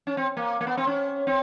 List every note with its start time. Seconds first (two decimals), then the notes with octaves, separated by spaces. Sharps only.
0.07 C#4
0.17 C4
0.37 A#3
0.61 A#3
0.67 B3
0.77 C4
0.87 C#4
1.27 C4